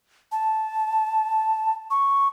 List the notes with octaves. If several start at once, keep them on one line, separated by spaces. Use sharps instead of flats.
A5
C#6